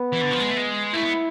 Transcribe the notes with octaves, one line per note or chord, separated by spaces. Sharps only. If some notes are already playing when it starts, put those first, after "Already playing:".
Already playing: B3
E3
D3
F3
G#3
A3
G#3
A3 E4
B3